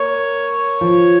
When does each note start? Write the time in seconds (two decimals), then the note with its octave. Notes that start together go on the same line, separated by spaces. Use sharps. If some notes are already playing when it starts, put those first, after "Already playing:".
Already playing: A#3 C#5
0.81 F3